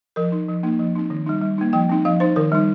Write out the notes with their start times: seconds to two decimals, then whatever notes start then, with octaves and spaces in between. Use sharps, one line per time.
0.16 F3 A#4
0.32 D#4
0.48 F3
0.63 A#3 D#4
0.79 F3
0.95 C4 D#4
1.10 D#3
1.26 G3 D#4
1.42 G3
1.58 A#3 D#4
1.73 F3 G5
1.89 C4 D#4
2.05 F3 F5
2.20 D#4 C5
2.36 D#3 A#4
2.52 G3 D#4